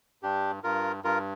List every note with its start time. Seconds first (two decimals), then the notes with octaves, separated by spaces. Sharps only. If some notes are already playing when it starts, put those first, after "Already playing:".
0.23 G2 D4 G4
0.64 G2 F4 A#4
1.04 G2 F4 A#4